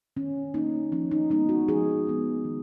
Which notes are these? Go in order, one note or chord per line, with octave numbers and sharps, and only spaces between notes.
D#3 C#4
A#3 C#4 D#4
F3 C#4
D#4
G#3 B3 D#4
F#4
F3 G#4
G#3 B3
D#3